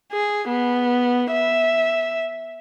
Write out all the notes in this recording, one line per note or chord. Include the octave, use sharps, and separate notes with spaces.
G#4
B3
E5